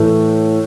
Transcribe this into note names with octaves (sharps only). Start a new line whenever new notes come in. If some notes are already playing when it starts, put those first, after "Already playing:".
Already playing: A2 E3 A3